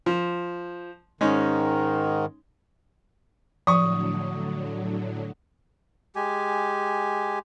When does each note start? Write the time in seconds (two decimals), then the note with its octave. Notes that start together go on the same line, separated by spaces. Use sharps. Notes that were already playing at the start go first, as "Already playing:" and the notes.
0.06 F3
1.21 G#2 D#3 G#3 C#4 D#4
3.67 A2 D3 F3 F#3 C#6 D#6
6.16 G#3 G4 G#5